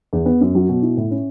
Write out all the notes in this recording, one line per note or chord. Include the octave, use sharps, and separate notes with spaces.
E2
B3
F#2
F#3
B2
E4
A2
C#4